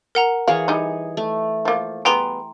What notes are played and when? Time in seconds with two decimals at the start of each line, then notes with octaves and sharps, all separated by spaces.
0.15 A#4 F#5 A#5
0.48 E3 G#4 C#5 F5
0.68 G3 D#4
1.17 A3
1.65 F3 A#3
2.05 G3 B3 G#4 G5 A#5 C6